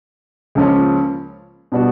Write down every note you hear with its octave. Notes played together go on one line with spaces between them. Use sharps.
C#2 C#3 F3 A#3 C#4
B2 G3 B3 D4 F#4